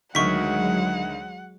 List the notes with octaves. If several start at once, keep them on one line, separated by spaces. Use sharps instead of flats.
D2 D#3 F#3 G#3 F#5 C#6 B6